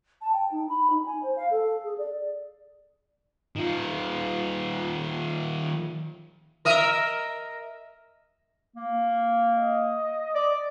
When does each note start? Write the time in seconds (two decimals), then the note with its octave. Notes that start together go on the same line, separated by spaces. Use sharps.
0.22 A5
0.33 G5
0.51 D#4
0.69 B5
0.90 D#4
1.06 G#5
1.23 C5
1.36 F5
1.51 A4
1.84 G#4
1.98 D5
3.56 D#3 F4
6.65 A#4 D#5 E5
8.76 A#3
9.53 D#5
10.35 D5